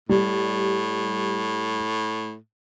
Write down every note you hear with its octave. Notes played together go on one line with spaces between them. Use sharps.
A2 G3